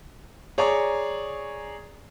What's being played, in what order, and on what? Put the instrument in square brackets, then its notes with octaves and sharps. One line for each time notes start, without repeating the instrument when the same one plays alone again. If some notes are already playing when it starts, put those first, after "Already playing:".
[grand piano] G#4 C#5 D5 A#5 C#6